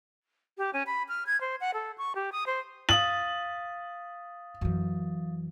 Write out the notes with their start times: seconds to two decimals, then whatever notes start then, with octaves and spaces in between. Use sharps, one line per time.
0.58 G4
0.74 C#4
0.87 B5
1.08 F6
1.27 G#6
1.41 C5
1.60 F#5
1.74 A4
1.98 C#6
2.15 G4
2.32 D#6
2.46 C5
2.89 F5 D#6 A6 F#7
4.61 F#2 E3